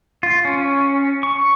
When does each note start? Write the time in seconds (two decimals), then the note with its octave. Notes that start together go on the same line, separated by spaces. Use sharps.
0.23 F4
0.45 C#4
1.23 C#6